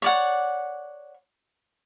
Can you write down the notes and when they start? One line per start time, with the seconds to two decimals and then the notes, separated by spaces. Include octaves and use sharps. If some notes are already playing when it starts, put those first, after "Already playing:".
0.02 C#5 D5 F#5